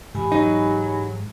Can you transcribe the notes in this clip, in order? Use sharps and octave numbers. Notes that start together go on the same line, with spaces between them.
G#2 E3 G4 G#5 B5
F#3 D#4